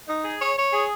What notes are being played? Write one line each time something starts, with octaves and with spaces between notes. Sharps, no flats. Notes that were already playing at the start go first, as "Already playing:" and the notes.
D#4
G#4
C#5
C#5
G#4